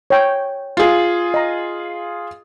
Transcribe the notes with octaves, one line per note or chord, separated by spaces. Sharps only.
C#5 G5
F4 G#4
D#5 A#5